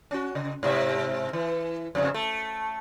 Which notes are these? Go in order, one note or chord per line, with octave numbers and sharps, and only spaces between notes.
C#4 F#4
C#3
G#2 C3 E5
E3
F2 G#2 C#3
A3